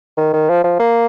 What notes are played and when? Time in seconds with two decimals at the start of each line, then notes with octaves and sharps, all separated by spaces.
0.17 D#3
0.33 D#3
0.49 F3
0.64 F3
0.79 A#3